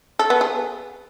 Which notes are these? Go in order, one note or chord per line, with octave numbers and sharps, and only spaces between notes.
A4
B3
G#4